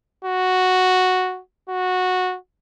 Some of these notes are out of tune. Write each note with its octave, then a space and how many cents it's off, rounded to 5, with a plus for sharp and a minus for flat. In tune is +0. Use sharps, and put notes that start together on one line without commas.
F#4 -5
F#4 -15